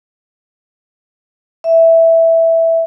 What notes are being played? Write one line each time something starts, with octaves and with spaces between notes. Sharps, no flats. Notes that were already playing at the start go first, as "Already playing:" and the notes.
E5